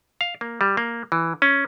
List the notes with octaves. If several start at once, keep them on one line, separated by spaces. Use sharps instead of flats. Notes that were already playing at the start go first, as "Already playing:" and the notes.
F5
A#3
G3
A#3
E3
C#4